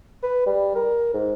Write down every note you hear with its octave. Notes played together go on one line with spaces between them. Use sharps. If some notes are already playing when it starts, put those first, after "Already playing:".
B4
G3
A#4
G#2